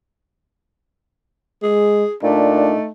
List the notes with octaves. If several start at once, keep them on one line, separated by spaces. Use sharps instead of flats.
G#3 G#4
A#2 A3 D4 D#4